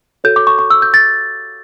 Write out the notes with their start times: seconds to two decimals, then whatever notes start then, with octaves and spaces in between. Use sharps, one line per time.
0.24 F#4 A4 C#5 G6
0.36 D6
0.47 C#6
0.59 C#6
0.71 E6
0.82 G6
0.94 A6